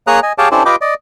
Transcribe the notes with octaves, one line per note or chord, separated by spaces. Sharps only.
A#3 G#4 C#5 A#5 D#6 F#6
D#5 G#5
G4 G#4 C#5 F5 G5 A5
C#4 D4 E4 G4 A4 C5
F4 G4 B4 D#5 G5 D6
D5 D#5